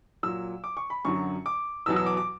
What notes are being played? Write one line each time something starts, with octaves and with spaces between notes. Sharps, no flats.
A#2 F#3 E6
D6
C#6
B5
F#2 D3 F#3 C#6
D6
E2 B2 F#3 E6
E6
D6
D6